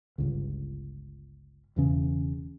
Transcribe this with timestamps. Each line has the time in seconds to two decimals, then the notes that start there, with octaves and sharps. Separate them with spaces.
0.18 G1 C#2
1.76 E1 E2 C#3